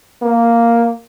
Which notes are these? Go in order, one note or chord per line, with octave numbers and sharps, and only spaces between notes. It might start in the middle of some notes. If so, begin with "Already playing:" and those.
A#3